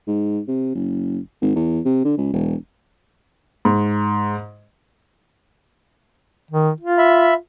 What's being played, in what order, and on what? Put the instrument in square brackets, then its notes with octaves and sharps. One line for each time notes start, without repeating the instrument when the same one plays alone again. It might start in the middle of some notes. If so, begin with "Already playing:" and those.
[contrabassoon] G#2
C3
F#1
G#1
E2
C3
D3
C#2
E1
[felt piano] G#2
[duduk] D#3
F4
[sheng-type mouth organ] E5 B5